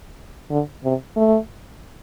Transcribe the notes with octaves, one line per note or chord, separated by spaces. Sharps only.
D3
C3
A3